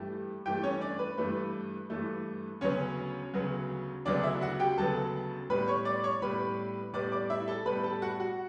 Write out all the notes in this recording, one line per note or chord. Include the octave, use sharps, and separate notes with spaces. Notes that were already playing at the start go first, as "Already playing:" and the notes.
Already playing: G2 E3 A3 G4
G2 E3 A3 G4 G5
C#4 C#5
D4 D5
B4
G2 E3 A3 B4
G2 E3 A3
D2 C#3 F#3 B3 C#4 C#5
D2 C#3 F#3 B3
D2 C#3 F#3 B3 D4 D5
E4 E5
F#4 F#5
G4 G5
D2 C#3 F#3 B3 A4 A5
A2 G3 B3 B4 B5
C#5 C#6
D5 D6
C#5 C#6
A2 G3 B3 B4 B5
A2 G3 B3 D5 D6
D5 D6
E4 E5
A4 A5
A2 G3 B3 B4 B5
A4 A5
F#4 F#5
F#4 F#5